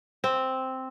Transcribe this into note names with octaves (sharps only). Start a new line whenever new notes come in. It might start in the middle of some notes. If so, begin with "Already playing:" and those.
C4